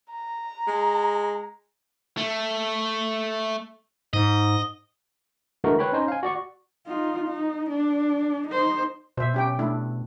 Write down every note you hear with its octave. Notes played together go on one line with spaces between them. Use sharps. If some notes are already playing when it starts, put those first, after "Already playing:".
A#5
G#3
A3
G#2 D#5
D3 E3 G#3 A3 F#4 A#4
B4 C#5 G5 B5
C#4 D#4 C5
F5 G#5
F#4 D5 C#6
D#4 F4
D#4
D4
D#4 C5
B2 C5 E5
C#4 G4 G5
A3 D4 E4